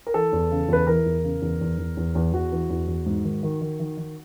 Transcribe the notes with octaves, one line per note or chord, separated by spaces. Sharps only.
A#4
E3 A4
E2
C#3
E2 B4
E3 A#4
E2
C#3
E2
E2
E2
E2
E2
E2 F#4
E3
E2
E2
G#2
D#3
D#3
D#3
D#3
D#3